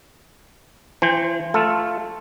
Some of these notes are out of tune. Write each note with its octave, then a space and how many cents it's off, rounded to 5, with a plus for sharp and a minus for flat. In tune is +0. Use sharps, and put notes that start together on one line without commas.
E3 +35 C5 +0 G5 +45
A3 +0 F4 +0 A4 +0